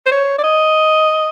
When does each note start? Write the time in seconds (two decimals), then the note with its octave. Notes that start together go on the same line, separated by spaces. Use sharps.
0.06 C5
0.12 C#5
0.39 D5
0.44 D#5